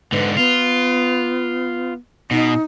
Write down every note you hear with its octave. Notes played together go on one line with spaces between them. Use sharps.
G#2 D3 B4
B3 F4
B2 D#4